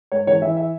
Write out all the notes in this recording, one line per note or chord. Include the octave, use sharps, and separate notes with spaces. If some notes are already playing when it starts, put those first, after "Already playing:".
G#2 C#5
E3 C#5
E3 E5
E5